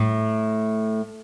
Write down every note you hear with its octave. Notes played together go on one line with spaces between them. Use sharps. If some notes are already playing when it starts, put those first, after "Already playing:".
Already playing: A2